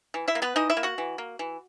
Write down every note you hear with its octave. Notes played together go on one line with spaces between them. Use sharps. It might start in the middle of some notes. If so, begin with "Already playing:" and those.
E3
E4 E5
A#3
B3 B4
E3 D#4 D#5
E4 E5
A#3
F#4 F#5
E3
A#3
E3